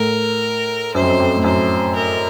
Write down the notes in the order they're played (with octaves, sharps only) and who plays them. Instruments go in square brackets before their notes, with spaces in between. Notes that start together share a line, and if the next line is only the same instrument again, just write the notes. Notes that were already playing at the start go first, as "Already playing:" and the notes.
Already playing: [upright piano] A2 [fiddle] A#4
[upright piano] F#2 [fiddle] C5
[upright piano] F2
F#2
F2
A2
[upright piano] F#2 [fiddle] C5
[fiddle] A#4